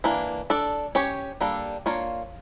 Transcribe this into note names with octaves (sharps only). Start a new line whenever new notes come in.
E3 A#3 D4
D4 A4 D5
C#4 G4 C#5
G3 A#3 D4 A4
A#3 D4 F4 C#5